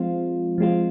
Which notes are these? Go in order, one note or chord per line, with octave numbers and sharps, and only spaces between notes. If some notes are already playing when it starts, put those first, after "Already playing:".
Already playing: F3 G#3 C4 F4
F3 G#3 C4 F4